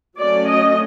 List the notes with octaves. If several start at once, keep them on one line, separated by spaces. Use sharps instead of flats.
F#3 A3 C#4 D5
D#5